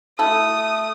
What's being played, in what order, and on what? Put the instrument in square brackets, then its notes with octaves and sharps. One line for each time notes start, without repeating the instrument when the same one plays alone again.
[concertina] A3 [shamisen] E4 F#4 A4 [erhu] D#6